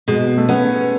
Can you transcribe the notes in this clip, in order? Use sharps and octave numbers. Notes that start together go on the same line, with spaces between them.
B2 G#3
A3
B3 C#4